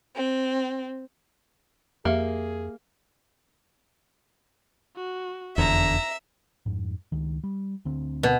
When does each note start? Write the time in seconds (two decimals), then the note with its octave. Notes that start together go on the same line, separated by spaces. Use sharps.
0.15 C4
2.05 F2 A#3 G4 G#4 E5
4.97 F#4
5.58 F1 E2 D3 E5 A#5 A#6
6.66 F2 G#2
7.12 C#2 D#3
7.44 G3
7.85 D2 D3 C4
8.23 B2